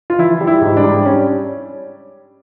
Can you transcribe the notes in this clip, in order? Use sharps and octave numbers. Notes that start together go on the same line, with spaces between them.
F4
E3 E4
G3
E4
G#2
D4
G3
C#4